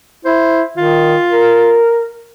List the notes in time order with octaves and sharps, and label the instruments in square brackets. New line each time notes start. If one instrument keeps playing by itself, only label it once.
[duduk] E4 [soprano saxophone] C5
[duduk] D#3 [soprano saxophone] F4
[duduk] A#4